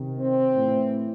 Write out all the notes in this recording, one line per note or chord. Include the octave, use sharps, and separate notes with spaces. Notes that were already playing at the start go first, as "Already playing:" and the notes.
Already playing: C3 D#3
C4
A2 E3